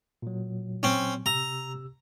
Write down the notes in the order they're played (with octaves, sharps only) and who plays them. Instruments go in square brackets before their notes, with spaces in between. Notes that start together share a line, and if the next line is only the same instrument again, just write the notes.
[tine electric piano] A#2 F#3
[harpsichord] C4 C#4
[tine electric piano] C3 G4 E6 [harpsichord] A#5